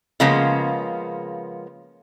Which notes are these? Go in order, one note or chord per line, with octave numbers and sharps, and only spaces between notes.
C#3 F3 G#3 A#3 B3 C#4